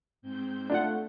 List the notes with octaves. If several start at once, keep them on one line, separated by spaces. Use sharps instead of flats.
G#2 C4 G6
A3 D4 F4 F#5